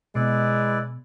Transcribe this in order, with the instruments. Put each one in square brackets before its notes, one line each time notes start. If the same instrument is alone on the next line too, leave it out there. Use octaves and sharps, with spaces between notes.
[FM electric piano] B2 [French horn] G#3 [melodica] E4 B4 D5